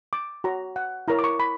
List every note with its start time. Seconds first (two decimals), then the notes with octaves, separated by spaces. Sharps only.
0.13 D6
0.44 F#4 C#5 A#5
0.76 F#5
1.08 E4 A#4 C#5 A#5
1.19 D6
1.24 C#6
1.40 B5